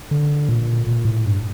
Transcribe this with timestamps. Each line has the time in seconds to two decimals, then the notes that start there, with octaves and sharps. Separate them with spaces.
0.11 D3
0.49 A#2
0.87 A#2
1.05 A2
1.25 G2